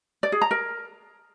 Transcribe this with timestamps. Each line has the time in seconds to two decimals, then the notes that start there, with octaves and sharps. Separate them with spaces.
0.23 D5
0.32 G#4
0.41 A#5
0.51 A#4